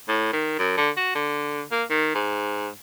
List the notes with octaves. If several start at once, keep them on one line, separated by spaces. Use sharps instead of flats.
A2
D#3
F#2
D3
F#4
D3
A#3
D#3
G#2